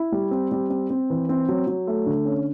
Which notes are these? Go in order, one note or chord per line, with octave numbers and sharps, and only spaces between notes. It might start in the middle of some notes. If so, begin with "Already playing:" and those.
Already playing: E4
G3
C4
G3
C4
C4
E3
C4
F#3
F#3
A3
D3
C#4